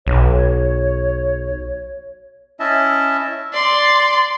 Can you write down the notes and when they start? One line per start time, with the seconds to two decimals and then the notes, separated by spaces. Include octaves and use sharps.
0.07 B1 C#5
2.60 C#4 E4 D#5 E5 A5
3.53 D5 C6